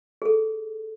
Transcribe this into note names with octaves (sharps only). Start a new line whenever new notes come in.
G#4 A4